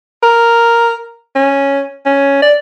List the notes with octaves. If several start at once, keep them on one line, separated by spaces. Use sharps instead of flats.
A#4
C#4
C#4
D5